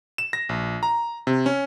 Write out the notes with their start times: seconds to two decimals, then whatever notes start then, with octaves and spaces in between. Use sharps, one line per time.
0.18 E7
0.33 A#6
0.49 A#1
0.83 A#5
1.27 C3
1.46 C#4